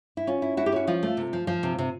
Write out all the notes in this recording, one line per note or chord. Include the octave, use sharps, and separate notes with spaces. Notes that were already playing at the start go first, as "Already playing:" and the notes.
E4
C#4 F4
E4
E4 F#4
G4
C#4 F#4
F3 F4
A3
C3
F3
F3
C3
C3